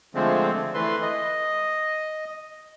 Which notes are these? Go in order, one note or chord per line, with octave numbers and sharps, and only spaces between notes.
D3 F3 G#3 A3 C4
E3 A3 B4 C6
D#5